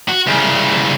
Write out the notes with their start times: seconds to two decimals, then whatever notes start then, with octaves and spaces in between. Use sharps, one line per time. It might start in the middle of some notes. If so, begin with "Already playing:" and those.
0.09 F#4
0.27 C2 C#3